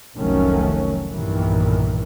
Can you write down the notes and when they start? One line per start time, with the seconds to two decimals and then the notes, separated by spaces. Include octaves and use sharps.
0.18 F1 C2 D#3 F#3 A3 C#4
1.12 B1 G2 A#2 D#3 E3